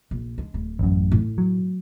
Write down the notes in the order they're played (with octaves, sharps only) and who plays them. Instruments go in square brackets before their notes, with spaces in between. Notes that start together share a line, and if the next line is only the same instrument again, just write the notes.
[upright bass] A#1
G#3 D4
D1
[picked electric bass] A1 F#2
[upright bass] A2
[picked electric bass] F#3